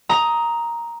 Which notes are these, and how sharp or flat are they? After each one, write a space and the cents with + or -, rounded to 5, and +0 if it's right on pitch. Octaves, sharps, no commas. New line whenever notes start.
A#5 +5 D#6 +15